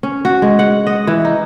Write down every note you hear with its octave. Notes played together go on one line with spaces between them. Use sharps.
C#4
F#4
G#3
F#5
D#5
E3
D#4